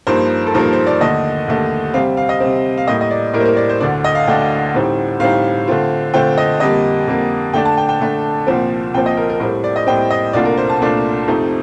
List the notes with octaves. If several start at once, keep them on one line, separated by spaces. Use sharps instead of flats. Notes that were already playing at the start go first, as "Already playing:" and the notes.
G2 F3 A#3 D#4 C5
A4
G2 F3 A#3 D#4 A#4
C5
D5
D#2 D3 A3 D#5
D#2 D3 A3
C3 G3 C4 F5
F5
D#5
C3 G3 C4
F5
A2 G3 A#3 D#5
D#5
D5
A2 G3 A#3 A#4
C5
A#4
D5
C5
D2 D3 A3 D4 D5
D#5
F5
D2 D3 A3 D4 G5
A2 G3 C4 D#4
A2 G3 C4 D#4 F5
D3 A3 C4 F4
D3 A3 C4 F4 G5
D#5
F2 D3 G3 A#3 D#5
F2 D3 G3 A#3
D3 A3 D4 G5
A5
G5
G5
D3 A3 D4
C2 A#2 F3 C4
C2 A#2 F3 C4 G5
D#5
A#4
A#4
A2 G3 C4 A#4
D5
D#5
A2 G3 C4 G5
D#5
C2 A#2 A3 D4 F4 D5
A#4
C5
A5
C2 A#2 A3 D4 F4
F2 C3 F3 A3 D#4